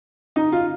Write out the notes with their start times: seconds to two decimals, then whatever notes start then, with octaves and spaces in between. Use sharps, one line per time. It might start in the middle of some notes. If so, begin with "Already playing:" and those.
0.36 D#4
0.52 F4